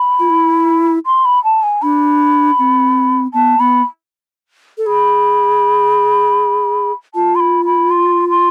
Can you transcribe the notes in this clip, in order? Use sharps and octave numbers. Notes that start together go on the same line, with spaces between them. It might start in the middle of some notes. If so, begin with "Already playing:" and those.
Already playing: B5
F4
E4
C6
B5
A5
G#5
D4 B5
C4
B3 A5
B3 B5
A4
G#4 B5
F4 A5
C6
B5
B5
C6
C6